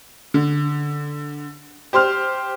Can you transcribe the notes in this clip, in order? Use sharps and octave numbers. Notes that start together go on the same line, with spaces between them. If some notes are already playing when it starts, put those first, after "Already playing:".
D3
G4 C5 C6 F6